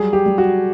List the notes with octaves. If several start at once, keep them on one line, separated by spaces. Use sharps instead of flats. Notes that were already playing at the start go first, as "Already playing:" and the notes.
Already playing: F#3 G3 G#4
G4
G3
F#4